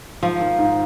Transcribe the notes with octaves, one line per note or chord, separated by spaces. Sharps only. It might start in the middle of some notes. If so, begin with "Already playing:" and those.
G#2 F3
D#3
G#2